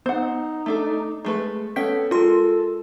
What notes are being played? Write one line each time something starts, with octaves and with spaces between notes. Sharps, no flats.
B3 D#4 C5 F#5
A3 D4 A4
G#3 A3 B4
B3 C#4 A4 G5 B6
G#3 F4 A4 A#4 C6